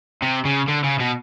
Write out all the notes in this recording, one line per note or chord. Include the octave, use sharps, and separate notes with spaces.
C3
C#3
D3
C#3
B2